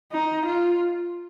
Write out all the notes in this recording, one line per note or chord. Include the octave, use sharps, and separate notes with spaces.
D#4
F4